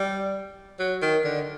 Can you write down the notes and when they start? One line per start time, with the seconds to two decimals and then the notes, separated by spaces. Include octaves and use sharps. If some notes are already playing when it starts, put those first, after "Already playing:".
Already playing: G3
0.79 F#3
1.02 D#3
1.24 D3